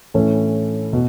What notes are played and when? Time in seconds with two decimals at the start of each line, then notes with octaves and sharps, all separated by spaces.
0.14 A2 E3 A3 C#4
0.93 B2